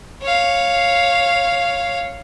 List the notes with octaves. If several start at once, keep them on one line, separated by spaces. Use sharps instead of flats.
C#5 F5